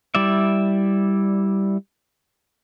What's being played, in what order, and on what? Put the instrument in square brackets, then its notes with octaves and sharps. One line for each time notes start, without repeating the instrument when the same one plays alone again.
[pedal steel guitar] G3 E4 D5 E5